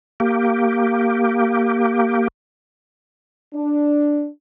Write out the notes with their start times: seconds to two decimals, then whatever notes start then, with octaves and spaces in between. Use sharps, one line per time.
0.20 A#3 G4
3.54 D4